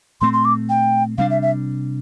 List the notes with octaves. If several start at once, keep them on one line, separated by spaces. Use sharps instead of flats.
A#2 A3 C4 C6
C6
D6
G5
C3 G3 D4 F5
E5
E5